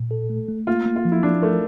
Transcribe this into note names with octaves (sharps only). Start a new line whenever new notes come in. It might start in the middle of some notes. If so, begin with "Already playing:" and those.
Already playing: A#2
A4
A3
A3
A#3 F4
A#3
F4
F3
E4
F3 D4
A3 A#4